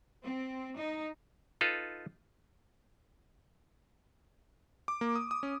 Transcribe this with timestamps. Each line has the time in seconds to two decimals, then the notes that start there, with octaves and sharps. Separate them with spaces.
0.25 C4
0.77 D#4
1.61 D#4 F4 A4 B4
4.88 D6
5.01 A#3
5.15 D#6
5.31 D#6
5.43 C#4